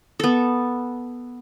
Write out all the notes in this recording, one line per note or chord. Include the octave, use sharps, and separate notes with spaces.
B3 A4